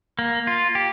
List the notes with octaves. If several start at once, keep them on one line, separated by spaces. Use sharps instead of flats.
A#3
F4
G4